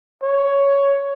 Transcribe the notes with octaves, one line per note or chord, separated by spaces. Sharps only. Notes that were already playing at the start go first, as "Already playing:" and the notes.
C#5